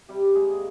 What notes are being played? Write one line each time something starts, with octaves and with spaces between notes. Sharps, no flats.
C3 G3 G4
G#3 A#3 G#4